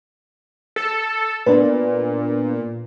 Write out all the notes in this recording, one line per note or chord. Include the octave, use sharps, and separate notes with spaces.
A4
A#2 B3 D4 B4